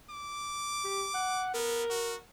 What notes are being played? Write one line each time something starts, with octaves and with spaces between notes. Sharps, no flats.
D6
G4
F#5
B3 A#4
F#4